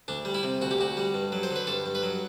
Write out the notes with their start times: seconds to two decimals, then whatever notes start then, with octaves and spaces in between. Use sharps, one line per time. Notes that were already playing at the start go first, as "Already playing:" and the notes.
0.08 D2 D4
0.25 G3
0.35 E4
0.43 C3
0.61 D2 F#4
0.71 G4
0.79 D2 F#4
0.97 G3
1.14 G2
1.32 F#3
1.43 C5
1.51 D3
1.56 B4
1.67 G2 A4
1.86 G2
1.95 B4
2.03 F#3